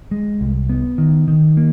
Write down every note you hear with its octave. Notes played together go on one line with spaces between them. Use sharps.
G#3
C2
B3
D#3
D#3
A#3